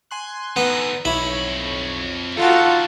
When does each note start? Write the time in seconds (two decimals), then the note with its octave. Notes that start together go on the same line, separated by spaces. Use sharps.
0.11 G#5 C6 F#6
0.57 D3 B3 D#4
1.05 B1 F2 E4 C#5 B5
2.37 D3 D#4 F4 F#4 A4 F#5 A5